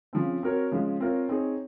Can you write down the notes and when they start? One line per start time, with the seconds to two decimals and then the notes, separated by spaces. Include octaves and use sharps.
0.13 C#3 F3 C4
0.43 C4 F#4 A#4 C#5
0.72 C#3 F3 G#3
1.00 C4 F4 A#4 C#5
1.29 C4 D#4 G#4 C#5